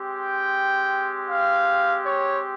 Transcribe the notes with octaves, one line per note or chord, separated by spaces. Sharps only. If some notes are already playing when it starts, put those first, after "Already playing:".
Already playing: G#3 C4 G4
G5
F5
C#5